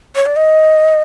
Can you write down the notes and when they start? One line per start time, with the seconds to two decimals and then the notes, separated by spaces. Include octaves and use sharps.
0.16 C#5
0.26 D5
0.36 D#5